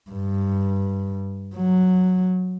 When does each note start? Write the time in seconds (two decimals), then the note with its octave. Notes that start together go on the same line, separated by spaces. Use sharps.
0.11 G2
1.56 F#3